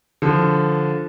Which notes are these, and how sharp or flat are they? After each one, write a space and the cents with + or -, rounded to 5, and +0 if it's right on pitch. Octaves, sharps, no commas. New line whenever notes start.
D3 +0 F3 +0